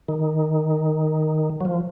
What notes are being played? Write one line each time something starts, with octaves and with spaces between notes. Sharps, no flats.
D#3
F#3
F3